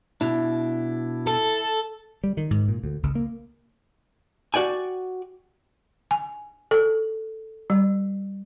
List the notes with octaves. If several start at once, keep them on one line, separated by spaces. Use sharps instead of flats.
B2 D4 E4
A4
G3
D#3
G#2
A#2
D2
C#2
A#3
F#4 D5 G5 G#5
G#5
A4
G3